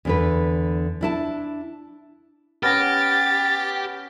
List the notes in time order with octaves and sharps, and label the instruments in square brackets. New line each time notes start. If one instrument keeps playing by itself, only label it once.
[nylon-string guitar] E2 D3 B4
D4 E4 A5
[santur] B3 C#4 G#5 [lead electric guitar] G4 [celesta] F6 A#6 [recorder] A6